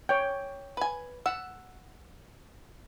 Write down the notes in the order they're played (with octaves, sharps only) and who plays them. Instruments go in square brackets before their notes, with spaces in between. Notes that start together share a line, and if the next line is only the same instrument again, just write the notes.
[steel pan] C#5 G5
[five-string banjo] B4 G#5
[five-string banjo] F#5 [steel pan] E6